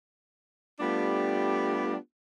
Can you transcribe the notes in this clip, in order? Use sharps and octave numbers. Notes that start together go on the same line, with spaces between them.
G3 A3 B3 D4 F4 G4